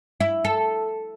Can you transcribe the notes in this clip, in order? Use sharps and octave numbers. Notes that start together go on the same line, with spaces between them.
E4
A4